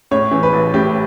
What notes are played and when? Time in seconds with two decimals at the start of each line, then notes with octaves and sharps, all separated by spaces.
0.11 A2 C#5
0.31 E3
0.43 B4
0.53 A1
0.74 A2 G4